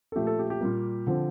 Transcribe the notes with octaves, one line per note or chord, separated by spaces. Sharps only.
A4
A#2 F3 A3 G4
A4
G4
G4
A#2 G3 A#3
D3 F3 C4